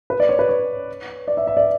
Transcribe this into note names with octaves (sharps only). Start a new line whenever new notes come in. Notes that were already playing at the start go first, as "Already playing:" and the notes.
B4
D5
C#5
B4
C#5
D5
E5
E5
D5